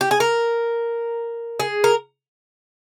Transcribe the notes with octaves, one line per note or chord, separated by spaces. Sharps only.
G4
G#4
A#4
G#4
A#4